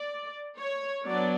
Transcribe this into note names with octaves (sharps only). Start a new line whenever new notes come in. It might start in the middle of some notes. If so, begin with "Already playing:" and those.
Already playing: D5
C#5
F#3 B3 D4 D5